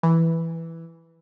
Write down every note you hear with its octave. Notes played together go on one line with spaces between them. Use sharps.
E3